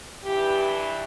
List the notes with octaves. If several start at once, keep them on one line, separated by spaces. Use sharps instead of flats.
G2 E3 G4